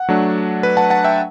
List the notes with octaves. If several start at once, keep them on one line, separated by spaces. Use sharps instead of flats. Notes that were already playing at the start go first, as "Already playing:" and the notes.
Already playing: F#5
F#3 A3 D4
B4
F#5 A5
F#5 A5
E5 G5